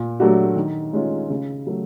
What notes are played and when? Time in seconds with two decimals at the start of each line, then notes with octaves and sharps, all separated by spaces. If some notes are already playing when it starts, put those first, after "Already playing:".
Already playing: A#2
0.20 F#3 A3 D4 F#4
0.56 D#3
0.93 G#3 C#4 F4
1.30 C#3
1.67 F#3 A3